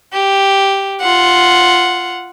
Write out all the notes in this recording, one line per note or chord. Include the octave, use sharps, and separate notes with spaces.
G4
F4 F#5